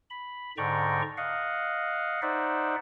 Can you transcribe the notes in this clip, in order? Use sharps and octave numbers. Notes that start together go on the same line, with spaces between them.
B5
G#2 D3 D5 G5 A#5 C#6
D#5 F5 F#5
D#4 C5 D5 E5 F#5